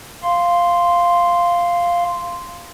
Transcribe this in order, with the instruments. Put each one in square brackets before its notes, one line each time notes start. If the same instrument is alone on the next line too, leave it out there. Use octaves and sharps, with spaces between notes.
[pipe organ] F5 C6